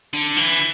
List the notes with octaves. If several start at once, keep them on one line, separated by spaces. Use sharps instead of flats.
D3
E3